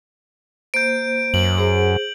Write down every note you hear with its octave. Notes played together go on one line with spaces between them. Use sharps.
A#3 C5 G6 D7
F#2 F#7
G#4 C5